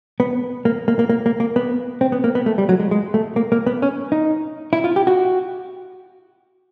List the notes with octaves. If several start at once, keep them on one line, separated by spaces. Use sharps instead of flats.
B3
A#3
A#3
A#3
A#3
A#3
A#3
B3
C4
B3
A#3
B3
A3
G3
F#3
G#3
G#3
A3
A#3
A#3
B3
C#4
D#4
E4
F4
G4
F#4